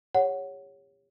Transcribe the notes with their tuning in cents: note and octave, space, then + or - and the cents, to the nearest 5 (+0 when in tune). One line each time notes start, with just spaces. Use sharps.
G4 +40 C#5 +0 F#5 +0